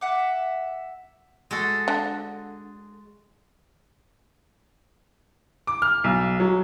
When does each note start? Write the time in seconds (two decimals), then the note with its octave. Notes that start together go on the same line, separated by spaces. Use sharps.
0.01 E5 F#5 D6
1.51 G#3 F#4 A4
1.88 D3
5.67 D6
5.82 F6
6.04 B1
6.40 F#3